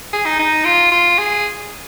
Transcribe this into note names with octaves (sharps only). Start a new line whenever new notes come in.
G#4
D#4
D#4
F4
F4
G#4